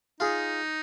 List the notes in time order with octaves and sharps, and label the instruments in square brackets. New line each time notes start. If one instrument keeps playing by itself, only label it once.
[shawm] D#4 [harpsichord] F4 G#4